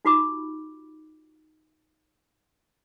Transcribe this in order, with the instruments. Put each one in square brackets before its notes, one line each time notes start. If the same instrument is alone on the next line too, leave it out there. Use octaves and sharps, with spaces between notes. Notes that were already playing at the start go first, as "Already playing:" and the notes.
[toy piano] D#4 F4 F#4 B5 D6